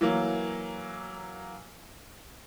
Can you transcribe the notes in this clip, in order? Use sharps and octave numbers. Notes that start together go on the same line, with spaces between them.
E3 F#3 A#3